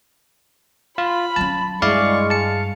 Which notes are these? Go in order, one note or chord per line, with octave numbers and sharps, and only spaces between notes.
F4 B5
F#3 C#4 A5
G2 G#3 E4 D5 F5 C#6
F5 A5 C#7